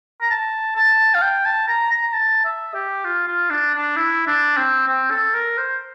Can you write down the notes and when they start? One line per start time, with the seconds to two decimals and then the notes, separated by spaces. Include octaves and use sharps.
0.21 A#5
0.30 A5
0.76 A5
1.14 F5
1.22 G5
1.45 A5
1.68 A#5
1.91 A#5
2.13 A5
2.44 E5
2.74 G4
3.04 F4
3.28 F4
3.50 D4
3.74 D4
3.96 E4
4.27 D4
4.57 C4
4.88 C4
5.10 A4
5.34 A#4
5.57 C5